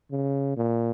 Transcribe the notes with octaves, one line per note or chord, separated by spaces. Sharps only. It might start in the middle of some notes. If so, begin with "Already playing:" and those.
C#3
A#2